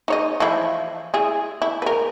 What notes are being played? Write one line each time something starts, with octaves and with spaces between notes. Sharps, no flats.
D#4 C#5 D#5
E3 F3 E4
E4 G#4
E4
A#4 B4